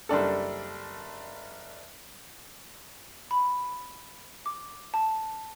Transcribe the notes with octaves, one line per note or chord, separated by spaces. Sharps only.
F#1 G3 D4 A4
B5
D6
A5